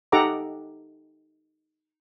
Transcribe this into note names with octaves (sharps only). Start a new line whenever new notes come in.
D#4 G4 A4 F#5 A#5 D6